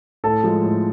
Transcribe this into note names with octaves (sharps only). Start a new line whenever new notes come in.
A2 A4 A5
F3 G#3
A2